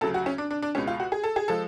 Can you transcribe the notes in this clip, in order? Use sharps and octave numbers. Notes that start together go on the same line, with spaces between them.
D2 C#3 F#3 A4
F#4
C#4
D4
D4
D4
C#2 B2 G#3 C#4
F4
F#4
G#4
A4
G#4
F3 G#3 A4